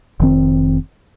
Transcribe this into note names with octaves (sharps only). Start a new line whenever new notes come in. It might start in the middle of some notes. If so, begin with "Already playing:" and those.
F1 D#3 C4